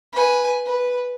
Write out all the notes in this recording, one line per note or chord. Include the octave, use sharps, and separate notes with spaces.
B4 G#5
B4